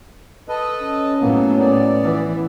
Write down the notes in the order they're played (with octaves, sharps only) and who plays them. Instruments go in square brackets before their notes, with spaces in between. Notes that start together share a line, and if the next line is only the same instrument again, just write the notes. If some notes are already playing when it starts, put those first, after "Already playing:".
[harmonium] A4 B4 D#5
[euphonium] C#4
[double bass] A2 F#3 [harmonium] A#3 B3
[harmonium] B3 D5
[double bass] E3